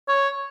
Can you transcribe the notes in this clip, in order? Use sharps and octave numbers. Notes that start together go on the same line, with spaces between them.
C#5